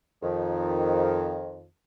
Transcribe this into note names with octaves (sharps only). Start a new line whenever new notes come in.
F2 D#3